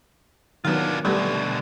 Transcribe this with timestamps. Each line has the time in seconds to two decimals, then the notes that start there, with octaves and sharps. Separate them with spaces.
0.65 D#3 F#3 B3 D4 F4
1.05 B2 D3 G3 A3 B3